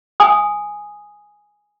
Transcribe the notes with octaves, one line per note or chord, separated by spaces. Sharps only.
G#5 D#6